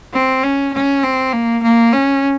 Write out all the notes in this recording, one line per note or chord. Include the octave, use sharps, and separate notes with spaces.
C4
C#4
C#4
C4
A#3
A#3
C#4